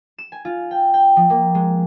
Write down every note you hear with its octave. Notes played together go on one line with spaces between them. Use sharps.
E7
G#5
F4
G5
G5
F3
A#3
G#3